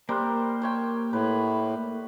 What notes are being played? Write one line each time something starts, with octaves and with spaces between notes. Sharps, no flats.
G3 A#3 A#4 C5 F#6
C5 C#5 G5
A2 B4